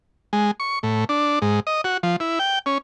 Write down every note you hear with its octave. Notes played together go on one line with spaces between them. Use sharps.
G#3
C#6
A2
D4
G#2
D#5
F#4
F3
E4
G5
C#4